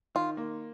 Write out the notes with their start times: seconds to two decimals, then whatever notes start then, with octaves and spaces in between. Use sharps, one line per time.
0.15 D#3 F4
0.37 A#3